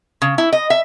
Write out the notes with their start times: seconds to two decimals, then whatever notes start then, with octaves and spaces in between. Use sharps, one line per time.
0.22 C#3
0.38 E4
0.53 D#5
0.70 E5